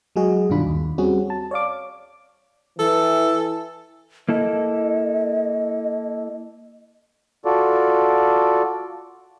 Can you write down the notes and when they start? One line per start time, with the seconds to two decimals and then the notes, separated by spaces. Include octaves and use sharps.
0.16 F#3 G#3 F#4 G#4 D#5
0.50 G2 B2 D#3 D4 F4 B5
0.66 D#2
0.98 G3 C4 C#4 F#4 G#4
1.30 A5
1.51 C#5 D5 F5 D6
2.79 E3 A4
4.29 A#3 E4 A4 D#5
7.45 F4 F#4 A4 D5